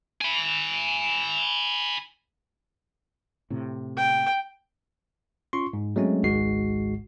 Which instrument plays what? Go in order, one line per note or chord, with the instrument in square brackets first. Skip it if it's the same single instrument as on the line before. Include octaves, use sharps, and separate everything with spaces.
[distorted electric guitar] G#5 B5
[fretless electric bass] A2 C3
[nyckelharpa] G5
[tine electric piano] C#4 F4 C6 C#6
G#2
F#3 G#3 A3 C4 C#4 F#4
G#1 C#2 G#2 G#3 F#4 C7